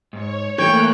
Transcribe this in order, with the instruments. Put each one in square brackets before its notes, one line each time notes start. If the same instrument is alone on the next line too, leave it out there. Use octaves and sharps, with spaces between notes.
[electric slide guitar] G#2 [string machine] C#5
[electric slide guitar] E3 [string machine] A3 A#3 F#6 [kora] C#5 [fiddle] G5